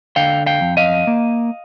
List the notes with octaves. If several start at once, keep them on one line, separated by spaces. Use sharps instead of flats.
D3 F5 G5
F5 G5
F2
D#5 F5
A#3